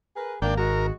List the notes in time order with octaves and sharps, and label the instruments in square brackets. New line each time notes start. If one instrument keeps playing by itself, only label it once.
[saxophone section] G#4 A#4 B4
[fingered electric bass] G#1 [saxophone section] A#3 [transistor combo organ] D4 G5
[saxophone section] G#3 F#4 [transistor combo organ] A#4